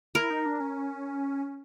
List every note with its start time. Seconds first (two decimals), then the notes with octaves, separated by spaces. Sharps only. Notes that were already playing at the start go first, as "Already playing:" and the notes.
0.15 E4 A#4
0.30 D#4
0.46 D4
0.60 C#4